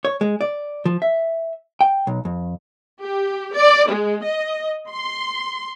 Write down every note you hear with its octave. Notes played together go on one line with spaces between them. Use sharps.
C#5
G#3
D5
F3
E5
G5
B1
F2
G4
D5
G#3
D#5
C6